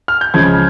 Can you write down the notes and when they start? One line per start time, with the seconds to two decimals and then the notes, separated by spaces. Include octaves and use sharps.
0.08 F6
0.21 G6
0.34 C#2 C#3 F3 G#6